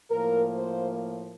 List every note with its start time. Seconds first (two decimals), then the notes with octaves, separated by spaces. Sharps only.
0.11 A2 F3 A#3 A#4
0.56 C5